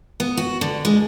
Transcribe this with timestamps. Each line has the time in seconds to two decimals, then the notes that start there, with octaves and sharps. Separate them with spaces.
0.20 B3
0.37 F#4
0.61 D3
0.85 G#3